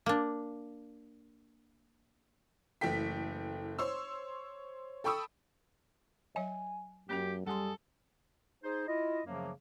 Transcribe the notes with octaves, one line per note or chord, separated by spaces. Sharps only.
A#3 D4
F#1 E3 A3 G5 B6
C5 C#5 C6 E6
A4 G5 B5 C#6 D#6 E6
F#3 C#5 D#5 G#5
F#2 A#3 C#4 G4 G5
F#2 G3 G#4 A4 F#5 C6
D#4 G#4 C5
E4 F4 D#5
F#2 C#3 F3 F#3 A3 A#3